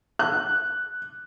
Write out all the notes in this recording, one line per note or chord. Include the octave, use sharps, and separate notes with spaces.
F#6